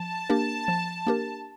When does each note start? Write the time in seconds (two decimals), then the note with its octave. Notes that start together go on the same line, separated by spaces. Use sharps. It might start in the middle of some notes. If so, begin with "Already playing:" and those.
Already playing: F3 A5
0.30 A#3 D4 G4 A#4
0.68 F3
1.07 A#3 D4 G4 A#4